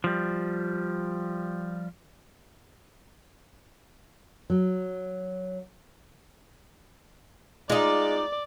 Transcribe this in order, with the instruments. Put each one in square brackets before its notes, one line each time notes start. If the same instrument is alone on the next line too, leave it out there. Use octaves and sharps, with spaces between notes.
[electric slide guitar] F3 G3
[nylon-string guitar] F#3
[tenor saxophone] G#3 [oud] D#4 F4 [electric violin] D5 D6